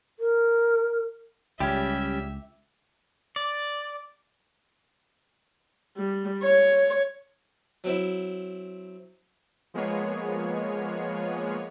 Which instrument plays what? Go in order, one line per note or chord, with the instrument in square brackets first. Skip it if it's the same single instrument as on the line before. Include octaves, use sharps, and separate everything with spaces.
[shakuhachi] A#4
[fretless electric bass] C#2 [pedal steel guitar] G3 C#4 [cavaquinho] G4 [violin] E5
[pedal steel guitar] D5
[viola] G3
C#5
[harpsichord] F#3 C4 E4
[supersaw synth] F3 G#3 A#3 B3 G#4 C#5